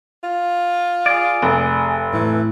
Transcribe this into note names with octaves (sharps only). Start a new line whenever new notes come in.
F4
G#4 D5
F1
A2 E3